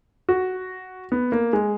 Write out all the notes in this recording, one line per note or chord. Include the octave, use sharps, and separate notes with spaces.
F#4
B3
A#3
G#3